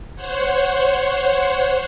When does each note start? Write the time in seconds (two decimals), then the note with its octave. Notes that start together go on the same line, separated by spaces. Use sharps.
0.16 C5 C#5 F#5